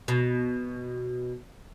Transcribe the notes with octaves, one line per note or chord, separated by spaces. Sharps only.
B2